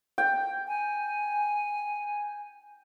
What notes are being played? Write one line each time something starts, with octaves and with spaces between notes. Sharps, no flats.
G5
G#5